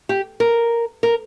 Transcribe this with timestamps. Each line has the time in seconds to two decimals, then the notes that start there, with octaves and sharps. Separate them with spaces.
0.09 G4
0.40 A#4
1.03 A#4